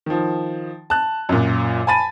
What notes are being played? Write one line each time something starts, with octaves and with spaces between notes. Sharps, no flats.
D#3 F3
A5 F#6
F#2 A#2
G#5 A5 B5 A6 D#7